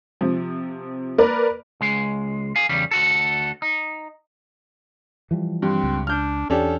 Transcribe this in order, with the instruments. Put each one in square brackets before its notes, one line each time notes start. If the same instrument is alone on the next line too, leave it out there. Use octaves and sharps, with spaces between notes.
[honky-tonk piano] C3 F3
A#3 A#4 B4 D5
[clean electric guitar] C#2 G#3
F5 G#5
E2 C#3 G3
D2 F#4 A4
D#4
[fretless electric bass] E3 F3 G3
[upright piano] G2 [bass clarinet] C4
[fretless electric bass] C#2
[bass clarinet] D4 [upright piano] F6 G6
[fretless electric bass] E2 [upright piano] C#4 D4 G4 [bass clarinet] A4